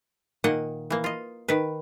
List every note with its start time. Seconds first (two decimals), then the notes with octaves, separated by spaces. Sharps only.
0.44 A#2 D#3 A#3 D#5 F#5
0.90 E3 A#3
1.04 F4 D#5
1.48 D#3 B4